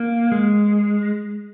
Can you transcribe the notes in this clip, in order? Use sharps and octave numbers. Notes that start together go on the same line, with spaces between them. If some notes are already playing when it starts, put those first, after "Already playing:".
Already playing: A#3
G#3